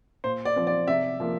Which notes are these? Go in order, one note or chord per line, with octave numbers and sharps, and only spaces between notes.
A#2 C5
D5
F3 C4
D5
C3 E5
F3 A#3